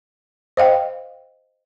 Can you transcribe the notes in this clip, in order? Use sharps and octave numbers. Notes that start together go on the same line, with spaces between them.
C5 D#5 F5 G5